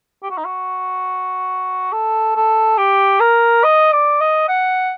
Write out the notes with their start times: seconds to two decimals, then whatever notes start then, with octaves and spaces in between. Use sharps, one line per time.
0.23 G4
0.30 F#4
0.38 D#4
0.45 F#4
1.93 A4
2.36 A4
2.78 G4
3.20 A#4
3.64 D#5
3.93 D5
4.21 D#5
4.49 F#5